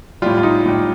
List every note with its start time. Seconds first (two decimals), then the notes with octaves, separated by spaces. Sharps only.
0.22 A2 G3 F4
0.38 F4
0.43 D#4
0.66 A2 G3